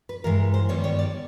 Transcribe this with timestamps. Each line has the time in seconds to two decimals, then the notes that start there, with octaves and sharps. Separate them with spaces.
0.09 B4
0.24 G2 E3 G#3 A#4
0.54 C5
0.69 G2 D#3 G3 B3 C#5
0.84 C#5
0.99 D5